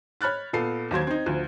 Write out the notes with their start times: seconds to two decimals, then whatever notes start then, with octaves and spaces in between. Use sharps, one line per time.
0.21 C#5 B5 F6 F#6 A6
0.53 A#2 B3 A4 C7
0.91 D#2 F#3 C5 G#6
1.07 C4 D#4
1.26 D2 F3